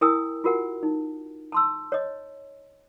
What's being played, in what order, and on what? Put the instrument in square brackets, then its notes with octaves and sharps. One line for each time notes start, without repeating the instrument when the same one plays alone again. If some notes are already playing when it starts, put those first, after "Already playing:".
[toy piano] E4 A#4 G5 G#5 D#6 E6
F4 F#4 A#4 F#5 G#5
D#4
A5 C6 E6
C#5 D#5